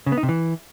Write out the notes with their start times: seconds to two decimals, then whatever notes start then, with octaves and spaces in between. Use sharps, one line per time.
0.06 C#3
0.12 B3
0.18 D#4
0.23 C3
0.29 E3